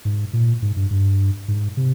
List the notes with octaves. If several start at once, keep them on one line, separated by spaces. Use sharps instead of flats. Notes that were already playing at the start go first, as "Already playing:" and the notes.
G#2
A#2
G#2
G2
G2
G#2
C3